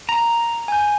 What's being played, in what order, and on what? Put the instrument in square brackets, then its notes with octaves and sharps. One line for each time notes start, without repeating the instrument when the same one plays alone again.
[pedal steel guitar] A#5
[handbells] G#5 G6